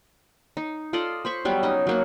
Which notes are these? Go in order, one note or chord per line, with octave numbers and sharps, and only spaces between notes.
D#4
F4 A4 D5 D#5
C5 B5 C#6
F#3 G3 B3
C#4 D#4 D#5
F#3 A#3 F#4